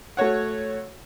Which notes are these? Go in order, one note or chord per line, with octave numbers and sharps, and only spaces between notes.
A3 F#4 C#5 F#5